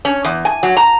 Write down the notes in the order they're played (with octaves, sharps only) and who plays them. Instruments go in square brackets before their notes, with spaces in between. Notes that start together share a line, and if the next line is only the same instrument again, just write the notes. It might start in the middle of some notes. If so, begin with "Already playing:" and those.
[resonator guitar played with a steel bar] C#4
E2
G#5
F#3
A#5